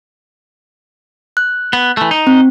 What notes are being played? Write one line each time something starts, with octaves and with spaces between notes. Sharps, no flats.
F#6
B3
E3 A3
D#4
C4